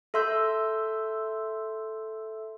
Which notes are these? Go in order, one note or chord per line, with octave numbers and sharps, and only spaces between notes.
A4 E5 C6 E6 G6